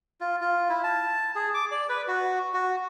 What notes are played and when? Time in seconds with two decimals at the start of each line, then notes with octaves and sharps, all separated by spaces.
0.21 F4
0.41 F4
0.69 E4
0.84 A5
1.35 G#4
1.54 D6
1.71 D5
1.89 B4
2.08 F#4
2.54 F#4